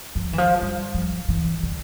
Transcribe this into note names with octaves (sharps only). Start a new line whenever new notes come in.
F3
E3
F3
G3
F3
E3
D3